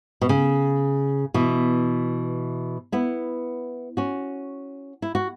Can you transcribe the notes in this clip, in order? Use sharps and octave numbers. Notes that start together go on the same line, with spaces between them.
B2
C#3
B2 E3
B3 E4
C#4 F#4
E4
F#4